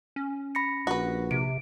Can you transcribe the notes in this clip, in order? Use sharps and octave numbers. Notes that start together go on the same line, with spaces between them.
C#4
B5 A#6 C#7
A#1 F#4 B4
C3 D7